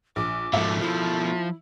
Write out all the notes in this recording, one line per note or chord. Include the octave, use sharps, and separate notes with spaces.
A#1 D6
G#2 B2 F3 A3 E5
F3 E4